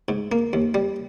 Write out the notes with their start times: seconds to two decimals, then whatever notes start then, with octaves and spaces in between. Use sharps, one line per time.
0.09 G#2
0.32 A#3
0.53 D#2
0.74 G3